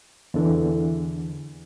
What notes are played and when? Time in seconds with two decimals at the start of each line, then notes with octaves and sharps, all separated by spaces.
0.34 E2 D3 E3